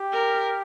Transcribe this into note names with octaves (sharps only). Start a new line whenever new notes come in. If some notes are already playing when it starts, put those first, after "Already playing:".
Already playing: G4
A#4